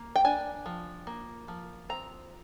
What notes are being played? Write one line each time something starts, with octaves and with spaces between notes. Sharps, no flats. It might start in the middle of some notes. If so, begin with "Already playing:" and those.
Already playing: A#3
G5
D4 G#5
F3
A#3
F3
C4 A#5